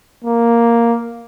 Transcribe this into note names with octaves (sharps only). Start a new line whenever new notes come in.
A#3